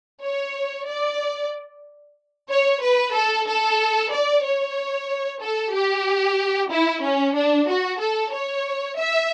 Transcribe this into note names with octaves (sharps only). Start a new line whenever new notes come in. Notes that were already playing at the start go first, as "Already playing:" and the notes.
C#5
D5
C#5
B4
A4
A4
D5
C#5
A4
G4
E4
C#4
D4
F#4
A4
C#5
E5